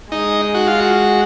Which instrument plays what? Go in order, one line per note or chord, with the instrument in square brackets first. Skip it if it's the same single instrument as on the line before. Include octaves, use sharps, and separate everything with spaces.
[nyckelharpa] G#3 [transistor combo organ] D#4
[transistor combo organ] F#4
F4
F#4